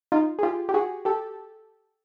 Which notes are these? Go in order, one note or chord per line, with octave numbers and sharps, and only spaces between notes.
D#4 F4
G#4
F4 G4
G4
F#4 G#4
G4 A4